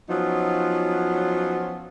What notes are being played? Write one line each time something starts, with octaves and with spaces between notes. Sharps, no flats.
F3 F#3 B3 C#4 D#4 F4